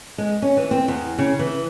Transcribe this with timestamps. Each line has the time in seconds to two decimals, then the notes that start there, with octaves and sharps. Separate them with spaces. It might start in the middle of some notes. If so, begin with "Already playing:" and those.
0.18 G#3
0.42 C#4
0.57 E3
0.71 C4
0.88 E2
1.18 C#3
1.39 E3